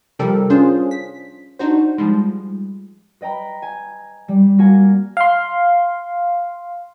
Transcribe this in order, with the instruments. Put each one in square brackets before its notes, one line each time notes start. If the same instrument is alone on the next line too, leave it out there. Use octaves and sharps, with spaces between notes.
[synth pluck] C3 F3 G3 G4 A4 A#4
C#4 D4 F4 G#4 C5
B6
D4 D#4 F#4 C5
F3 G3 G#3
[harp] B4 D#5 G5 A#5 B5
G#5
G3
A#3 F#4 G#5
[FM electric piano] F5 C6